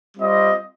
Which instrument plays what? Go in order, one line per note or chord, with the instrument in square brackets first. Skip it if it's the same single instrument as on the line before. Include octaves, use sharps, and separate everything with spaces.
[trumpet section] G3 C4 F4 D#5